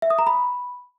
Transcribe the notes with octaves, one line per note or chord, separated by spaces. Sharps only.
E5
D#6
A#5
B5